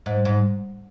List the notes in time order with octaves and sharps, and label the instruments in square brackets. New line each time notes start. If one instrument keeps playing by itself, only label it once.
[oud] G#2
G#2